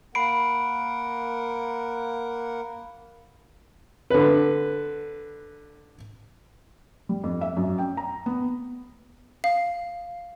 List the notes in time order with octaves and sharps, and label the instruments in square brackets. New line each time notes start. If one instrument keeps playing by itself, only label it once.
[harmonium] A#3 A#4 F#5 [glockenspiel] B5 C7 D7
[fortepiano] D3 B4
[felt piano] G3
F2
E5
F#2
G5
A#5
B3
[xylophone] F5